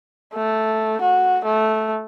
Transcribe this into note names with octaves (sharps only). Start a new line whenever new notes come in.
A3
F#4
A3